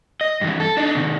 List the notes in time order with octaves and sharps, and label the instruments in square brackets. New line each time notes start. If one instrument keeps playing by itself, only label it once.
[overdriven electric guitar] D#5
G2 E3
A4
D4 D#4
C3 D#3